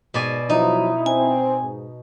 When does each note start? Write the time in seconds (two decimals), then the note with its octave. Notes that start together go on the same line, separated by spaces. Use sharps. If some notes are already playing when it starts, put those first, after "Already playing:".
0.14 G#2 B2 D5 G#5
0.50 F3 F#3 D#4 E4
1.06 C4 G#5
1.62 G#2